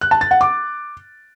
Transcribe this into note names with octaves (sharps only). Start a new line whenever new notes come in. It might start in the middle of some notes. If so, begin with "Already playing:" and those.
F#6
A5
A6
F#5
D6